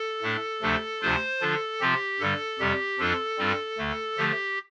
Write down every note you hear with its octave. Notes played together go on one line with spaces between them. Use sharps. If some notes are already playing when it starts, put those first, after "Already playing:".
Already playing: A4
A2 A3 D4
D2 C3 F3 A3 D4
D2 C3 F3 D4 F4 C5
D3 F3 D4 F4 A4
C3 F3 C4 F4 G4
G2 D3 G3 A4
F2 C3 G3 G4
F2 F3 D4 F4 A4
G2 G3 C4 F4
D2 D3 A3
D3 F3 A3 G4